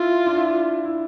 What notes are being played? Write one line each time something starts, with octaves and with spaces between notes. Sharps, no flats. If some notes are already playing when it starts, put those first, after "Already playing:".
Already playing: E4 F4
D4
E4
E4